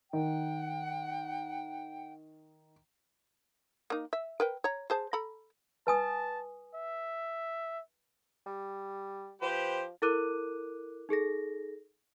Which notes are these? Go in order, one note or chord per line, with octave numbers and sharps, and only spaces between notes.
D#3 F#5 G5
A#3 D#4
E5
A#4 B4 G5
C#5 A#5
G#4 C5 A5
A4 A#5 B5
B4 G#5 A5 D#6
E5
G3
F3 G4 B4 C5
E4 A4 A#4 D6 F#6 D#7
D#4 G#4 A4 A#6